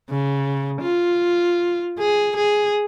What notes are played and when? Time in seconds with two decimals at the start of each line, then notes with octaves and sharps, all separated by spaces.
0.11 C#3
0.82 F4
1.99 G#4
2.37 G#4